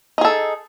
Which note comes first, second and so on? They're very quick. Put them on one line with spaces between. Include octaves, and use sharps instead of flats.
D#4 G#4 A4